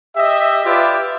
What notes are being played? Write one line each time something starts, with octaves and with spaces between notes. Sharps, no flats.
G4 D#5 E5
F4 G4 B4 D5 E5